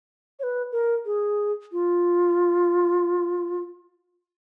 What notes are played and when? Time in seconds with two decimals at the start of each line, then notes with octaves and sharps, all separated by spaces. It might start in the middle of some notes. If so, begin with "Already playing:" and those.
0.39 C#5
0.43 B4
0.72 A#4
1.05 G#4
1.72 F4